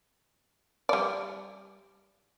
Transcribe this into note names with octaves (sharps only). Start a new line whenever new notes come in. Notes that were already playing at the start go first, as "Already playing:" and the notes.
G3 D5